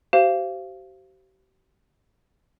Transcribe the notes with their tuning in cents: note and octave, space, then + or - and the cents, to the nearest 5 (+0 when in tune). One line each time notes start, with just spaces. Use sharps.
G4 -45 C5 +0 F5 -25